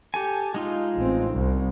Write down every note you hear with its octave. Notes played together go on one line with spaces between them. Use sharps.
G4 A4 G#5
G#3 D#4 F4
A1 C4
C2